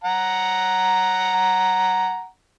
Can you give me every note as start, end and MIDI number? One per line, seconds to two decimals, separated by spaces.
0.04 2.27 78
0.04 2.27 82